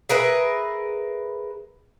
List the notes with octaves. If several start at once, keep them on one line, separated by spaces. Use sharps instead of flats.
G#4 A#4 B4 E5